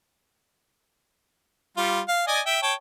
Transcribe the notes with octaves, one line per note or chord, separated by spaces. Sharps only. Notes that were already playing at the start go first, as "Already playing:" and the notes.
G3 F4
F5
D5 D#5 G#5
E5 G5
C#5 G5 A5